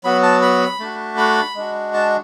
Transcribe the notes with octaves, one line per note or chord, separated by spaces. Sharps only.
F#3 B3 F#4 B5
A5
B5
A3 D4 F#4
B5
G#3 D4 F#4
A5